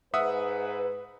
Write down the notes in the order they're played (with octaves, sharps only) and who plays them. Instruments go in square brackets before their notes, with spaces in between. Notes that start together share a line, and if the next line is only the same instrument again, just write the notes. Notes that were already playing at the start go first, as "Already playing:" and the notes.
[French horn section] G#2 B4 [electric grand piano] E5 F#5 D#6